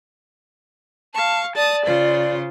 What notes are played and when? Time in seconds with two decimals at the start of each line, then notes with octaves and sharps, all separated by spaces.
1.14 F5 A5 C#6
1.56 D5 A5 D#6
1.85 C#3 F4 C5